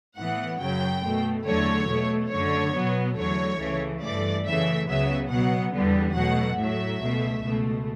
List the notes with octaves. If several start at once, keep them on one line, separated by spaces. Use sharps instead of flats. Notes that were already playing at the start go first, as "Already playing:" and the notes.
A2 E3 B3 F#5
F#2 C#3 F#3 G5
B2 A3
E2 D3 F#3 A3 C#5
B2 A3
F#2 D3 A3 C#5
B2 F#3 B3
E2 D3 F#3 A3 C#5
C#2 C#3 E3 A3
G2 E3 A3 D5
F#2 C#3 E3 A3 E5
C#2 C#3 F#3 B3 E5
B2 F#3 B3 F#5
E2 D3 G3 B3
B2 F#3 A3 F#5
A2 F#3 A3 E5
C#2 B2 A3
C#2 B2 A3